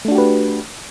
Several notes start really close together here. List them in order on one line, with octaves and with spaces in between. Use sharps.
A3 D4 F#4 G4 B4